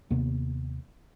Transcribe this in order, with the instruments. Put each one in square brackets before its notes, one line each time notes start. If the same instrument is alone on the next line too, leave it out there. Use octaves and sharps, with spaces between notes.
[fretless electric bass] D#2 C3 B3